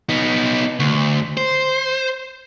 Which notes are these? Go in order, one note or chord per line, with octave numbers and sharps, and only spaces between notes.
B3 D#4
D2
C5